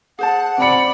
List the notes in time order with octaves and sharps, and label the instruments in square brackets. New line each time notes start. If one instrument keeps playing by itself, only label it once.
[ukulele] G#4 C5 A5 [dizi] F#5
[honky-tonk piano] C4 C#7 [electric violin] D5 B5